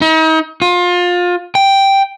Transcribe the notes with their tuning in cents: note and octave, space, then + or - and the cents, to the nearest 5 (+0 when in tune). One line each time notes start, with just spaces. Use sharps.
D#4 +40
F4 +25
G5 +0